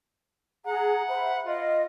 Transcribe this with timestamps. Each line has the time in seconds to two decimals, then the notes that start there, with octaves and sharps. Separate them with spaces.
0.66 G#4 F#5 A#5
1.08 C5 E5 B5
1.45 F4 D#5